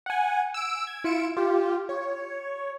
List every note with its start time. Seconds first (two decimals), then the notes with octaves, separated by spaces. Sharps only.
0.06 F#5 G#5
0.54 E6 D7
0.87 G#6
1.04 E4 F4 C#7 D7 E7
1.37 F4 G4
1.89 C#5